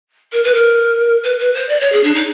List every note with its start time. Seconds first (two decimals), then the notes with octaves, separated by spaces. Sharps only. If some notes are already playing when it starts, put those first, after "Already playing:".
0.32 A#4
0.43 B4
0.54 A#4
1.23 B4
1.39 B4
1.54 C5
1.69 D5
1.80 C#5
1.92 G#4
2.03 D4
2.14 D#4